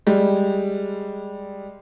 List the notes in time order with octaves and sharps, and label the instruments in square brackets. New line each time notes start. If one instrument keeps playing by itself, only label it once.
[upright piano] G3 G#3